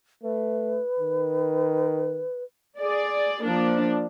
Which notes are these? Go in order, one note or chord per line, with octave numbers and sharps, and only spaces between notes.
A3 B4
D#3
G#4 D5
F3 A#3 D4